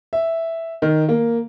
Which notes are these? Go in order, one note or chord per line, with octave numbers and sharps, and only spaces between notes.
E5
D#3
A#3